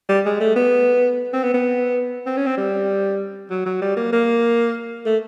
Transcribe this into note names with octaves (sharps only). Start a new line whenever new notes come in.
G3
G#3
A3
B3
C4
B3
B3
C4
C#4
C4
G3
F#3
F#3
G3
A#3
A#3
A3